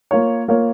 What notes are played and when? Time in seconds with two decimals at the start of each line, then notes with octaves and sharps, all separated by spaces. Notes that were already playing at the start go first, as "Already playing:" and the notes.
0.11 A#3 F4 A#4 C#5
0.48 A#3 F4 A#4 C#5